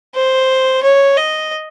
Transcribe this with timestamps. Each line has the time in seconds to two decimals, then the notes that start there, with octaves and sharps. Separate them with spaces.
0.15 C5
0.83 C#5
1.17 D#5